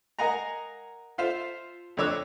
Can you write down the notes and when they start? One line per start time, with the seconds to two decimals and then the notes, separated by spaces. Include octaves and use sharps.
0.19 A#4 D#5 F5 F#5 G#5 A#5
1.18 F4 A4 C5 E5 F5
1.97 F2 D3 C#5 D6 E6 F#6